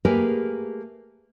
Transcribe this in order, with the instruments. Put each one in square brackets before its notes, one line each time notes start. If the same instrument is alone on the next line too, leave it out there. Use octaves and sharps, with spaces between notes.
[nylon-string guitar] A3 A#3 G4 G#4 A#4 B4